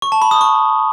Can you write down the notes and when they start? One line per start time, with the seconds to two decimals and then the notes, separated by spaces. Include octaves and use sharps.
0.02 C#6
0.12 A5
0.22 B5
0.31 D#6
0.41 C#6